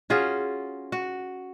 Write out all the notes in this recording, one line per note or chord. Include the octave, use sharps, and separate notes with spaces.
C#4 F4 F#4 G#4
F#4